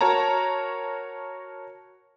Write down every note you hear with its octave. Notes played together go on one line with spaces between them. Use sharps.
F#4 A#4 C#5 A5 A#5